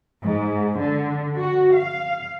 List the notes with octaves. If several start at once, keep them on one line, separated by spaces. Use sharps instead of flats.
G#2
D3
F#4
F5